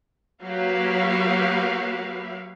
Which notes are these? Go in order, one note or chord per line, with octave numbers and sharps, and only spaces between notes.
F#3 A#3 F#4 G4 B4 F5